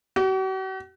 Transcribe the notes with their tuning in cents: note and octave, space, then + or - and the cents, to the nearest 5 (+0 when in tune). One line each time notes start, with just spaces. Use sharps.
F#4 +45